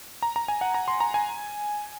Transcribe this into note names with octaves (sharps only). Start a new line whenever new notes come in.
A#5
A#5
G#5
F#5
A#5
C6
A#5
G#5